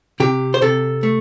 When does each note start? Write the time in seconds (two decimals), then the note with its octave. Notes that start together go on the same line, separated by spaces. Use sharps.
0.20 C3 G4
0.54 C5
0.62 C3 A4
1.03 A3